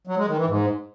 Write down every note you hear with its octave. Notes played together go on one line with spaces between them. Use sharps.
F#3
G#3
D#3
E3
G#2